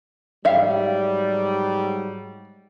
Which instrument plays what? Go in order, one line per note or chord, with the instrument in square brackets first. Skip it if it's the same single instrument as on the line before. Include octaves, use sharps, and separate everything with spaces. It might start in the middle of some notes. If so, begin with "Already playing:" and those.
[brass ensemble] G#2 F#3 G3 [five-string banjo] E5 F5